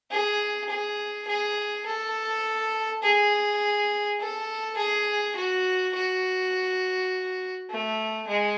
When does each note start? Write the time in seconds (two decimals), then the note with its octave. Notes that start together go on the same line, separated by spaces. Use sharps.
0.11 G#4
0.69 G#4
1.27 G#4
1.86 A4
3.03 G#4
4.20 A4
4.77 G#4
5.36 F#4
5.94 F#4
7.70 A3
8.28 G#3